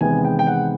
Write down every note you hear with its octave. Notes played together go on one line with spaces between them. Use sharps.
E2 C3 D#3 G#3 B3 G#5
G5
G5
F#5